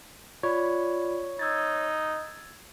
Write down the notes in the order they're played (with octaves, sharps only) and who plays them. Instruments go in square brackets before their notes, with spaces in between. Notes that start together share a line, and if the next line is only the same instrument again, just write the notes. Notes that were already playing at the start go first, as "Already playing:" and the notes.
[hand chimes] F4 D5 B5 [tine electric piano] C#5
[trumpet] D#4 [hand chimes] E6 G#6 A6